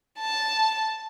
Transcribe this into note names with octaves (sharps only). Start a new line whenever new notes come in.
A5